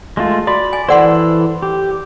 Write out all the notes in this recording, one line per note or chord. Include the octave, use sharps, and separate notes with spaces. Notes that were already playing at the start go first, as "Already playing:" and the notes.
G#3 A3 F4
F#4 D5 B5
G#5
E3 A4 C5 D5 F#5 C6
G4